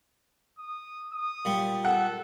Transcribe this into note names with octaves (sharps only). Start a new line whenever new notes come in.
D#6
D#6
A#2 G3
A4 F#5